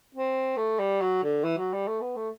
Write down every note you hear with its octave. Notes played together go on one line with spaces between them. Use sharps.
C4
A3
G3
F#3
D3
E3
F#3
G3
A3
B3
A3